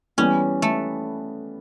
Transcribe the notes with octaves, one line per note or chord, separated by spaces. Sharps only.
E3 G3 B3 C#4
A3